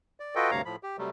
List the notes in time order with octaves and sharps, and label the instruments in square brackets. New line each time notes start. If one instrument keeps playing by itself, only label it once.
[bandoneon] D5
F4 F#4 A4 B4 D#5 G5
D2 G2 C3 C#5 F5 A#5
A2 F3 B5
G4
C3 F#3 G3 A3